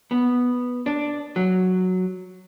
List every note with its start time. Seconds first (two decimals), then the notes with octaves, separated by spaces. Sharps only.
0.11 B3
0.86 D4
1.36 F#3